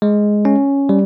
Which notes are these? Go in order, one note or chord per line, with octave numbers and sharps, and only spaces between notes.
G#3
C#4
G3